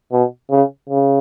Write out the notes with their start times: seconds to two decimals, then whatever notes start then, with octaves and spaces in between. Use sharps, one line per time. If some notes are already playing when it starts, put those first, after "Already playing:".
0.12 B2
0.51 C#3
0.89 C#3